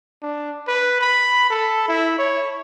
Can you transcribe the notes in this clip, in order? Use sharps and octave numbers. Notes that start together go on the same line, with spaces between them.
D4
B4
B5
A4
E4
C#5